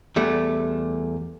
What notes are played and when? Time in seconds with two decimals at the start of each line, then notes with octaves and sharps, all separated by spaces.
0.16 E2 G3 A3